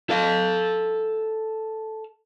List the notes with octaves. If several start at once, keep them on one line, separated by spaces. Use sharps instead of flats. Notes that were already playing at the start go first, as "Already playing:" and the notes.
A4 F5